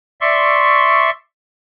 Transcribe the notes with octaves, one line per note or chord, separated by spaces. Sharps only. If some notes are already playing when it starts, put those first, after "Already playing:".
D5 E5 C6 C#6